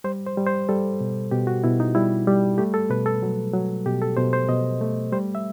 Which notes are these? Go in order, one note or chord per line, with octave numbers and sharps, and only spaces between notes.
G3 C5
C5
G3
C5
G3 A4
B2
B2 G4
F#4
B2 E4
D#4
G3 E4
G3
A3 G4
A4
B2 B4
A4
F#3
F#3
B2 G4
A4
B2 C5
C5
B2 D#5
A3
G3 C5
E5